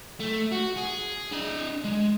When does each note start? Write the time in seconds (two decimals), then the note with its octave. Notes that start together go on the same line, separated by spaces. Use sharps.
0.20 A3
0.52 F#4
0.77 G#4
1.32 D4 D#5
1.84 G#3